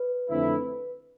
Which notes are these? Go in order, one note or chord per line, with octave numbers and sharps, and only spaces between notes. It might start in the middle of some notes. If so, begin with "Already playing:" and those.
Already playing: B4
F2 D3 A3 C4 E4